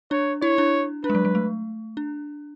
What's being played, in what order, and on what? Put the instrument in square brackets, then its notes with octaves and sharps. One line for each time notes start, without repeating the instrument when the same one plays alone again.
[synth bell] D4 [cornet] C#5
[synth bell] E4 [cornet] C#5
[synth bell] D4
[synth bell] D4 [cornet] B4
[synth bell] G#3
F#3
F#3
A3
D4